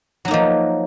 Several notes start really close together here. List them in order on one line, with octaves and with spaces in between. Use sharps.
F#3 D#4 A#3 F3